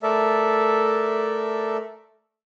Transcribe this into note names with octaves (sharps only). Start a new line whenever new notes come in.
A3 A4 A#4 D5 E5